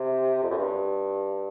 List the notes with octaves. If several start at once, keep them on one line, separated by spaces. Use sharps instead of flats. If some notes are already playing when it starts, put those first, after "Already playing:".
Already playing: C3
F2
F#2
G2